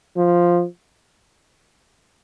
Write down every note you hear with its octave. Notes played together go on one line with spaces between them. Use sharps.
F3